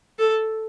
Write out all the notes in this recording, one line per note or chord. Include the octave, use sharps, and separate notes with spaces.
A4